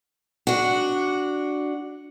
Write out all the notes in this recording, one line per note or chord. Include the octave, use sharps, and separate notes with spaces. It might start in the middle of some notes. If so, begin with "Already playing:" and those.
D4 F#4